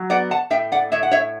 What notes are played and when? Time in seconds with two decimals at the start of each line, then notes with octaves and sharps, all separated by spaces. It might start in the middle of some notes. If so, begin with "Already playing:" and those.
Already playing: F#3
0.10 B3 D5 F#5
0.31 F#5 A5
0.50 A2 E5 G5
0.72 D5 F#5
0.92 A2 C#5 E5
1.03 F#5
1.11 C#5 E5